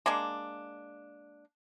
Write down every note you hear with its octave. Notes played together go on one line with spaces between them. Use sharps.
G#3 A#3 D4